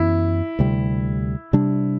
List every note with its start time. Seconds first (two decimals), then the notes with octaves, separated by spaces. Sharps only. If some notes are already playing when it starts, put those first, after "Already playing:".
Already playing: F#2 E3 B3 E4
0.59 D2 C3 G3
1.53 C3 G3 D4